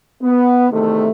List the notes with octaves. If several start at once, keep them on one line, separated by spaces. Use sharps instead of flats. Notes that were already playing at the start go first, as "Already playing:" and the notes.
B3
E2 C3 D#3 A3